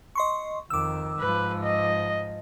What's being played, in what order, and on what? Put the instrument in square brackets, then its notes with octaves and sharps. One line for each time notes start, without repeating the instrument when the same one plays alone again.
[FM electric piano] D#5 C6 C#6
[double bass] F2 D#3 [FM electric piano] D6 E6
[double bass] G#2 F3 [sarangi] B4
[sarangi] D#5